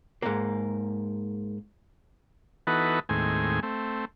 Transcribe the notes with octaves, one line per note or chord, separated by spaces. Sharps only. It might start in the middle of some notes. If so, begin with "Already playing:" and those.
G#2 A#3
E3 B3 D#4 F#4 A4 B4
D#2 A2 G#3 C4 G#5
A3 C4